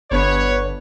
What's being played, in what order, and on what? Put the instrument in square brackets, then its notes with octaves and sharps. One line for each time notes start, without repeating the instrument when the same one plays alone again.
[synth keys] G1 B3 D4 [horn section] B4 C#5